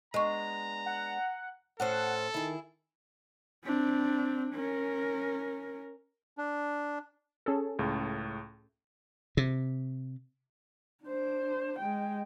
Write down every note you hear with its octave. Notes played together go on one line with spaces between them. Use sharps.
G#3 B3 D4 D#5 A#5 C#6
F#5
A2 C#4 A4 C5 F#5
D#3 E4 G#4
C4 D4
C#4 A#4
D4
C#4 G#4 A4
C#2 A2
C3
D4 C5
G#3 G5